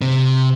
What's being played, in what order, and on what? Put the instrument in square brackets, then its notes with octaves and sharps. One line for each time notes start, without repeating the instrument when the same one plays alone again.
[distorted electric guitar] C3